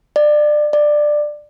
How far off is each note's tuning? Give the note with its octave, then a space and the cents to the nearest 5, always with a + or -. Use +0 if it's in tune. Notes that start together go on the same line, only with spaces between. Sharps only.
D5 +25
D5 +15